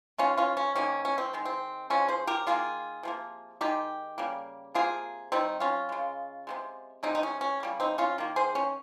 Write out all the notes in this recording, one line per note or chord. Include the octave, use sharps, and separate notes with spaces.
D#3 G#3 C#4 F4
C#4 F4
C#4
C3 D#3 A#3 C#4
C#4
C4
D#3 G#3
C4
C#3 F3 G#3 C#4
G#4 C5
G4 A#4
D#3 A#3 F4 G#4
C3 F3 A#3
D#3 G#3 D#4 G4
C#3 G3 A#3
C3 F3 A#3 F4 G#4
C3 D#3 G3 C4 D#4
C#4 F4
C#3 G#3
C3 D#3 G#3
C3 D#3 G#3 C4 D#4
D#4
C#4
C#4
C#3 G3 A#3
C4 D#4
C#4 F4
D#3 A#3
G#4 C5
C#4